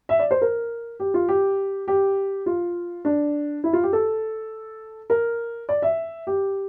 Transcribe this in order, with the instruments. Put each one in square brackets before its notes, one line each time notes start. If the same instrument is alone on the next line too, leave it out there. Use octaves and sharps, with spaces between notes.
[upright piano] E5
D5
C5
A#4
G4
F4
G4
G4
F4
D4
E4
F4
G4
A4
A#4
D5
E5
G4